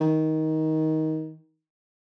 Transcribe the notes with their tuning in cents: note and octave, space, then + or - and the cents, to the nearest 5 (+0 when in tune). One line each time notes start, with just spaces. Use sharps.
D#3 +15